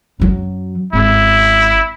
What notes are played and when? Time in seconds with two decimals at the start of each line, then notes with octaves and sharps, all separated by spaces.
0.20 F#2 F#3
0.93 G#1 E4